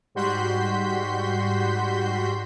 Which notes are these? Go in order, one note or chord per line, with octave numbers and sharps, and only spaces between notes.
G#2 G3 F#4 C6 G6 B6